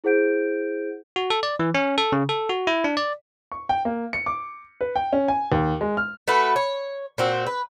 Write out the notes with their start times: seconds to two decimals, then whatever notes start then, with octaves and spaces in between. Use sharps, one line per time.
0.04 E4 G#4 C5 F#5 G6 D7
1.16 F#4
1.30 A4
1.43 D5
1.59 E3
1.74 C#4
1.98 A4
2.12 C#3
2.29 A4
2.49 F#4
2.67 E4
2.84 D4
2.97 D5
3.52 C#6
3.69 G5
3.85 A#3
4.13 C#7
4.26 D6
4.81 B4
4.96 G5
5.13 C#4
5.28 G#5
5.52 D#2
5.81 G#3
5.97 F6
6.28 A3 F#4 B4
6.56 C#5
7.18 A#2 C4 F#4
7.46 B4